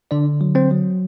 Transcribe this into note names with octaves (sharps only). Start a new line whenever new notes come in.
D3 D4 D5
F#3
C4 C5
F#3